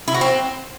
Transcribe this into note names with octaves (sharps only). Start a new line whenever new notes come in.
E4
F#4
C4